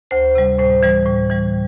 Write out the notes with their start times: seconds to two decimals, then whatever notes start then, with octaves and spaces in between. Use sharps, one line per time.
0.11 D2 C5
0.35 C3 G3
0.58 A2 C5
0.83 E3 G3
1.06 A2
1.30 E3 G3